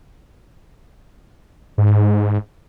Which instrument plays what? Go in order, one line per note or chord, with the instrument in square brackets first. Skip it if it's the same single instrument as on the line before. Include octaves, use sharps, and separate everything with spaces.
[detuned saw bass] G#2